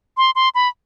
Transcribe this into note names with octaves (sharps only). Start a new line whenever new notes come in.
C6
C6
B5